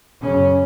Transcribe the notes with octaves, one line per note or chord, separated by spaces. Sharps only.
F#2 C#3 C#4